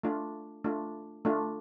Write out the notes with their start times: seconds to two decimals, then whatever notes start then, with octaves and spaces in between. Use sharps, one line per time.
0.03 A3 D4 F4
0.64 A3 D4 F4
1.25 A3 D4 F4